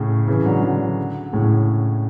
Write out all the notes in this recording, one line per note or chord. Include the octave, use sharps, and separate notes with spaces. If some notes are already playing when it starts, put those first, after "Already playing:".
Already playing: A2 C#3
C#3 E3
D3 F#3
D3 F#3
A2 C#3